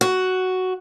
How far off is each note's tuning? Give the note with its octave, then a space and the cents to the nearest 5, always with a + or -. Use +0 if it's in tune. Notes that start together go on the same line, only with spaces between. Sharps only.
F#4 +5